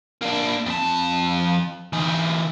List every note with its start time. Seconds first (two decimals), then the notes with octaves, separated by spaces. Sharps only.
0.22 A#3 D4
0.66 F2 A5
1.93 E3 D#4